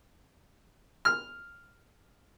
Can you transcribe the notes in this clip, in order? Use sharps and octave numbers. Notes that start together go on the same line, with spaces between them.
F6